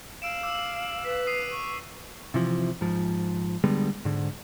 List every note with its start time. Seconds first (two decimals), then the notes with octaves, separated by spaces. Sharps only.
0.22 F5 E6 D7 E7
0.43 D6 E6
1.05 B4 B6
1.27 D#6 C7 D#7
1.52 C#6
2.34 C3 E3 F3
2.81 G#2 F3
3.64 D3 G3 G#3 B3
4.05 G#2 D3